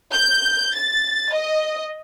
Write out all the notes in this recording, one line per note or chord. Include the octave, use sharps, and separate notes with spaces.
G6
A6
D#5